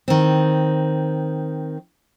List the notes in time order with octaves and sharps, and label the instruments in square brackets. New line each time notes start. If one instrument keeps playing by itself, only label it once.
[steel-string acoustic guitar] D#3 C4